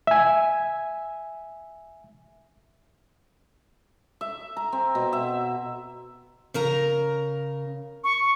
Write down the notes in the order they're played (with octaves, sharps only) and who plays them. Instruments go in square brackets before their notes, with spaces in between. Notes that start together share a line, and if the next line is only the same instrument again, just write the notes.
[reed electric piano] E5 G#5
[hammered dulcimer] E5
A#5
C4
B2
E5
[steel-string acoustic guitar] C#3 A#4 A#5
[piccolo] C#6